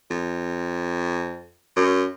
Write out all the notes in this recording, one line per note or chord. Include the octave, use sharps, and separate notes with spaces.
F2
F#2